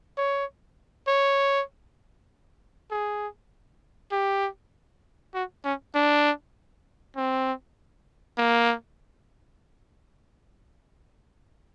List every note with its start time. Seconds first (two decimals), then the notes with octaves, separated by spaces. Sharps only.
0.17 C#5
1.07 C#5
2.91 G#4
4.11 G4
5.34 F#4
5.64 C#4
5.95 D4
7.16 C4
8.38 A#3